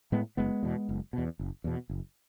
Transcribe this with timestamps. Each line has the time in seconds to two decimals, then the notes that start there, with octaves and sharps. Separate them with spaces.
0.12 A2 G#3 B3
0.37 F#1 G#3 B3
0.63 E2 B2
0.89 F#1
1.13 E2 B2
1.39 F#1
1.64 E2 B2
1.89 F#1